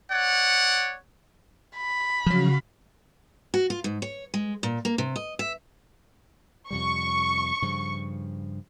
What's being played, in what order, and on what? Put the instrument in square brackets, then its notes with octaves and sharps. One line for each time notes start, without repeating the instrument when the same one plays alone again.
[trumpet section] C#5 D5 F#5
[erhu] B5
[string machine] C#3 F#4 F5 [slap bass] F3 F#3
[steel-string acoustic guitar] F#4
F4
G#2
C#5
G#3
A#2
A#3
C3
D#5
E5
[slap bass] F2 C3 G3 [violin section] C#6
[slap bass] G2 C#3 F3